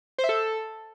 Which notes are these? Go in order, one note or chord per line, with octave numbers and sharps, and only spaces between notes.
C5
E5
A4